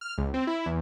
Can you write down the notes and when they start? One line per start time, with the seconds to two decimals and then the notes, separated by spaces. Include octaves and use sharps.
0.01 F6
0.18 C#2
0.34 C4
0.47 E4
0.66 E2